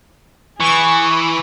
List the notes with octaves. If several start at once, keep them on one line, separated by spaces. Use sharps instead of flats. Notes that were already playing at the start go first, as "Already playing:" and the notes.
E3 G#4 C#6